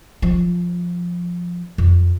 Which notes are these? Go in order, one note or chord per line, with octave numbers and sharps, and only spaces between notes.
F3
F2